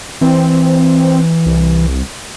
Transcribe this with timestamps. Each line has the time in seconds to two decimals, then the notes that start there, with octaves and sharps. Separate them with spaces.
0.21 E3 C4
1.46 C2